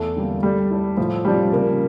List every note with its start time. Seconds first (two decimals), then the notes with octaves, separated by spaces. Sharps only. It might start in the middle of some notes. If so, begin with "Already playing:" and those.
Already playing: E2 A3
0.16 D3 G3 A#3
0.43 G3 A3
0.71 E4 A4 D5
0.97 A2 F3
1.25 F3 G3 C#4 G4 D5
1.53 C#3 A#3